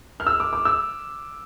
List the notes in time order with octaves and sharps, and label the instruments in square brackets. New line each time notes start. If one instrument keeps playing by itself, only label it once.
[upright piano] F6
E6
D6
D6
E6